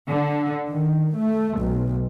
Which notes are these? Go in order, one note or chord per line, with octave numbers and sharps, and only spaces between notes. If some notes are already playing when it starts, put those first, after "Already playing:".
D3
D#3
A3
B1